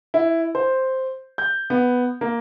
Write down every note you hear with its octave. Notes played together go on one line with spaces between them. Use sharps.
E4
C5
G6
B3
A#3